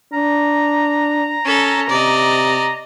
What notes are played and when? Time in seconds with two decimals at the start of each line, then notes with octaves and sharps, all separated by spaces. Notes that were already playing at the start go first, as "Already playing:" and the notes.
0.13 D4 A#5
1.45 C#4 A4
1.89 C3 D5 D#5